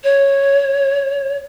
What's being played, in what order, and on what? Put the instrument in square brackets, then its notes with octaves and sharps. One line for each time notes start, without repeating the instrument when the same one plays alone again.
[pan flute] C#5